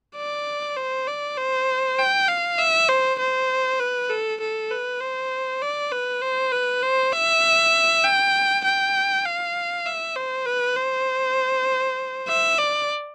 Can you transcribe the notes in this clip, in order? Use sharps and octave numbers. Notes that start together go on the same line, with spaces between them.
D5
C5
D5
C5
G5
F5
E5
C5
C5
B4
A4
A4
B4
C5
D5
B4
C5
B4
C5
E5
G5
G5
F5
E5
C5
B4
C5
E5
D5